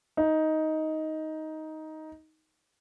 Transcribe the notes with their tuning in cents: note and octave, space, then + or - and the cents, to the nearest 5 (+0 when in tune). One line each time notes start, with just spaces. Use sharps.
D#4 +10